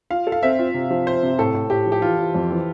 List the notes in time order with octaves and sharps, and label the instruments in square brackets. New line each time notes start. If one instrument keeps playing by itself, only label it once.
[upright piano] F4 [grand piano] F5
[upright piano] A4
[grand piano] F5
[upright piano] C4 [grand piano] E5
[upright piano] F4
C3
F3
[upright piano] C4 [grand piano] C5
[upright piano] C3
[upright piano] A2 [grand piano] A4
[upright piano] A2
[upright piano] A2 [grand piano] G4
[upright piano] F3
[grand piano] G4
[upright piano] E3 [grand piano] F4
[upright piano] E3
F2
E3